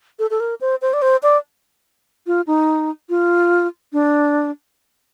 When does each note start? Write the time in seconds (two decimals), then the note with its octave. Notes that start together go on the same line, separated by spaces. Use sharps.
0.19 A4
0.30 A4
0.40 A#4
0.61 C5
0.82 C5
0.93 D5
1.02 C5
1.23 D5
2.27 F4
2.47 D#4
3.09 F4
3.93 D4